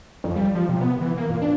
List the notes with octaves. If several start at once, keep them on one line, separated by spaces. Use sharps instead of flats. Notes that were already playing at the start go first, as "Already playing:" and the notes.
F2
G3
F3
C3
B3
E3
A#3
A#2
D4